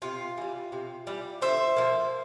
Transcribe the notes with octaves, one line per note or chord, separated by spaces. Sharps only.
C3 F4
E3 G3
C3
E3 G3
D3 C5 E5
F3 A#3